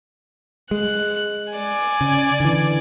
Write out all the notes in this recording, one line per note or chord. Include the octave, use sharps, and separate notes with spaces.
G#3 F#6
D5 G#5
C#3
D3 E3